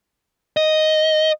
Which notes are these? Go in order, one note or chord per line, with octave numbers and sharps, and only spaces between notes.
D#5